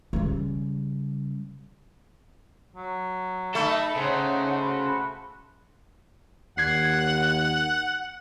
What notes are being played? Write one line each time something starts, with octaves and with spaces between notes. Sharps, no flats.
C#3 G3
F#3
A3 D#4 A4 B5
C#3 D#4 C5 C#5 F#5
F#4 B5
D#2 F#5 G#6 C7